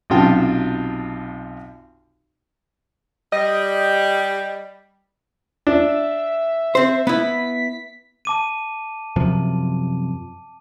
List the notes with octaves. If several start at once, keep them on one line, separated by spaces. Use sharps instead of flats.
B1 F#2 C3 F4 G5 A5
G3 D#5
D4 E5
C4 C5
B3 E4 B6
A5 D6 D#7
F#2 C3 F3